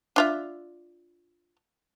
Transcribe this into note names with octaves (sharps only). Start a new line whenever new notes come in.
D4 F4 E5